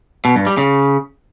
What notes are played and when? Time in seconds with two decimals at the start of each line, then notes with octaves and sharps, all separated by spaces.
0.25 B2
0.36 G2
0.47 G3
0.57 C#3